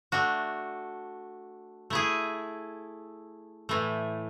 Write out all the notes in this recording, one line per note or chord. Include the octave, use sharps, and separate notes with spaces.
A3 D4 F#4
A3 E4 G#4
A2 E3 A3